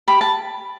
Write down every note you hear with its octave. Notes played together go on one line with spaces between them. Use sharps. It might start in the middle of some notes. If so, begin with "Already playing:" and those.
G4 B5
A5